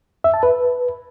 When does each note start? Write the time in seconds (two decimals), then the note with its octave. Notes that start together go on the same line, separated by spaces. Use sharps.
0.24 E5
0.34 A5
0.43 B4